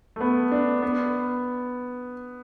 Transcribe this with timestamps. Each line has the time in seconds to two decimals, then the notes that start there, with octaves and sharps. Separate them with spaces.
0.16 A3
0.21 B3
0.52 D4
0.82 B3